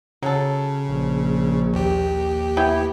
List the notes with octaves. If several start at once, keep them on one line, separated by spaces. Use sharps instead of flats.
C#3 F#3 A4
A#1
D#2 G4
B3 E4 G5